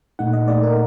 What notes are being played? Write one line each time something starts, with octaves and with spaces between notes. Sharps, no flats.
A#2 A3 D#4 F#5
D#5
A#2 A3 D#4 D5
A#4